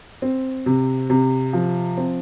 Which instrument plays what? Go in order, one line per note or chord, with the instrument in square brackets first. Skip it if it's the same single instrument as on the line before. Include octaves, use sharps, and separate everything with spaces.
[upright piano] C4
C3
C3
F3
C4